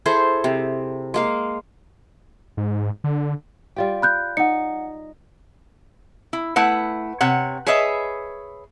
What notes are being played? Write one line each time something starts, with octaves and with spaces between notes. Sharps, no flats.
E4 G#4 A4 C5
C3
G#3 A#3 F5
G#2
D3
G3 F4 G4
B5 F#6 G6
D#4 F#5 C#7
E4
A3 E4 B4 F#5
C3 C#5 F#5
G#4 B4 C#5 D#5 E5